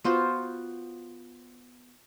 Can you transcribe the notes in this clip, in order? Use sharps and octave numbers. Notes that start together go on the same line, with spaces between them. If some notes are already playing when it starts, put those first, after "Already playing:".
B3 F4 F#4 C5